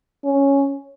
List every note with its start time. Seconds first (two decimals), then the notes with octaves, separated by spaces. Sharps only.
0.25 C#4